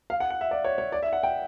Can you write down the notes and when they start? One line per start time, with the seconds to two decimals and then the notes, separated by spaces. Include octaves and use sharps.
0.10 F5
0.20 F#5
0.30 F#5
0.41 E5
0.51 D5
0.65 C#5
0.78 C#5
0.92 D5
1.03 E5
1.13 F#5
1.23 G5